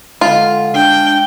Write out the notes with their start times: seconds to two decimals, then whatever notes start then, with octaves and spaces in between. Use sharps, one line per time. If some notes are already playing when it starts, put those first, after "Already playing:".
0.21 D3 G#3 F4 D#5
0.75 D4 G5